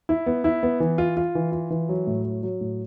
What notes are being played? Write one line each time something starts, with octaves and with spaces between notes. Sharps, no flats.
E4
B3
E4
B3
E3
F4
F4
E3
F4
E3
F#3
A2
F#3
F#3
A2